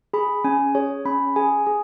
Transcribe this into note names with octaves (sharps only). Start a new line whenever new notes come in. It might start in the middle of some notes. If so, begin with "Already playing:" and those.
G#4 B5
C#4 G#5
G#4 C#5
C#4 B5
G#4 G#5
G#4